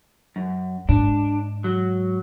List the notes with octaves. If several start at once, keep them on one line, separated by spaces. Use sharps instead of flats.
F#2
G#2 D4
F#3